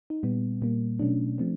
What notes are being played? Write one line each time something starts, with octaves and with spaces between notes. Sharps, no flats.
D#4
A#2 G3 B3
A#2 G3 A#3
B2 F#3 A3 C#4 D4
F3 A3 C4